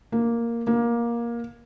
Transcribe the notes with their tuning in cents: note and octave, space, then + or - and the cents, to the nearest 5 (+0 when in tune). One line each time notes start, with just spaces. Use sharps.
A#3 +0
A#3 +15